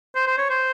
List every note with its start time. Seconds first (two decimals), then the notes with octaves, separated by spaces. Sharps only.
0.15 C5
0.27 C5
0.38 C#5
0.50 C5